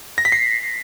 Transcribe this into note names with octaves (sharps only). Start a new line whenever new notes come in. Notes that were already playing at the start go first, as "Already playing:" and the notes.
A#6
B6
C7